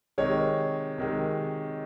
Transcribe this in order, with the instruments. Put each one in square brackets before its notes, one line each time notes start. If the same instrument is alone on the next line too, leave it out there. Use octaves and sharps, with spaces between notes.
[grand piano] C3 D#3 G#3 C#5
C3 D#3 G#3